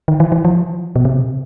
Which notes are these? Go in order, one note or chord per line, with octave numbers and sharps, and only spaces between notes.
D#3
E3
E3
F3
B2
C3